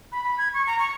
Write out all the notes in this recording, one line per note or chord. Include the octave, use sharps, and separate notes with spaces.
B5
B5
G#6
C#6
A#5
C#6